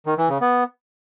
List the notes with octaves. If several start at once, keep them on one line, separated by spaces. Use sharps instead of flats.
D#3
E3
C#3
B3